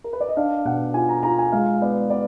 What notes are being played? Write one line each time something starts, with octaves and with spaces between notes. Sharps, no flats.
A#4
B4
D5
D#5
D4 F5
B2 F#5
F4 G#5
A#5
F4 A#5
G#5
G#3 F5
B3 D5
B3 D5